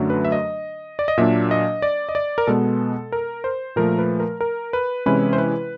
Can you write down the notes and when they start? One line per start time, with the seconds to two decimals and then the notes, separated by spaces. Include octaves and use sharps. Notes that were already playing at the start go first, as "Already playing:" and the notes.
Already playing: F#2 D3 F#3 A3 D4
0.10 B4
0.25 E5
0.32 D#5
0.99 D5
1.08 D#5
1.17 A#2 F#3 A#3 D4 E5
1.51 D#5
1.82 D5
2.09 D#5
2.15 D5
2.38 A#4
2.47 B2 G#3 B3 A4
3.12 A#4
3.44 C5
3.76 A#2 F3 A3 A#4
3.99 B4
4.20 A#4
4.41 A#4
4.73 B4
5.06 C3 E3 G#3 C#4 E4 B4
5.33 C5
5.38 B4